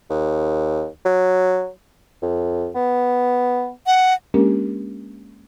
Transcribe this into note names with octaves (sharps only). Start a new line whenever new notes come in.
D#2
F#3
F2
B3
F#5
G#3 A#3 C#4 D4 G4 A#4